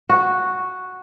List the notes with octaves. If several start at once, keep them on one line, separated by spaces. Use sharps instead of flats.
F#4